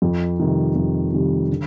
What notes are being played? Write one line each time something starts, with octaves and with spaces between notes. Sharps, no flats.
F2
C3 D#3 G3
F2
C3 D#3 G3
D3